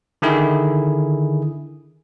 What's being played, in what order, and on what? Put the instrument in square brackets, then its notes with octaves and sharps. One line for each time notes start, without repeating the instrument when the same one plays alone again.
[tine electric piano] D3 D#3 E4 G#4